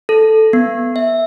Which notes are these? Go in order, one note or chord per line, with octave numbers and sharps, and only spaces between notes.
A4
B3
E5